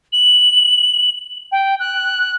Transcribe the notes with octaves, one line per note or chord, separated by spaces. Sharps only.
F#7
G5
F#6